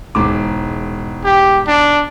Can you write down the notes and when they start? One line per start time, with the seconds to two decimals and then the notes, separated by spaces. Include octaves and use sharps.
0.15 E1 G#2 D6
1.24 G4
1.67 D4